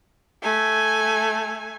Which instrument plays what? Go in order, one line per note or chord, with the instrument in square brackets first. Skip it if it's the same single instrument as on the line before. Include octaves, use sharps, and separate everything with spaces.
[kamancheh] A3 G#5